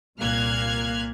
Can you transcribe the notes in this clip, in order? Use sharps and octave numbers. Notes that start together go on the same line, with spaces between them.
C2 A#2 A#3 F6 F#6 G#6